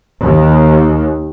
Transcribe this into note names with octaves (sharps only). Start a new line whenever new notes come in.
D#2